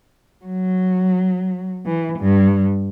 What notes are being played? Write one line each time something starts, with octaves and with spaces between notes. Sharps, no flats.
F#3
E3
G2